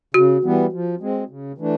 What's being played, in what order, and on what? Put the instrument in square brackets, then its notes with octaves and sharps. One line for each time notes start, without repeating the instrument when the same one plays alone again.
[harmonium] C#3 [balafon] F#4
[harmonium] E3 G3 B3
F3
G#3 C4
C#3
E3 A3 D4